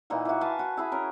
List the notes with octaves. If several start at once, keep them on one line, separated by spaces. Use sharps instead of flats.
A#2 E3 D#4 F#5
E3 F#4
B4 F5 G#5 A5
F#4
E4 G#4 B5
C#4 A#4